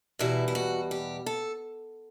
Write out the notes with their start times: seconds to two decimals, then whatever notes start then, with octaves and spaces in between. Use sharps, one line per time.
0.19 E2 B2 G3 E4
0.48 E4
0.55 F#4
0.91 G4
1.26 A4